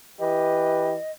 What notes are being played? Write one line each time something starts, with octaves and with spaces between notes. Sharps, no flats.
E3 G4 B4 D#5